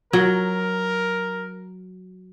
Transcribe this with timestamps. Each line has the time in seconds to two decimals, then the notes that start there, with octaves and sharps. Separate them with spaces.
0.13 F#3 A#4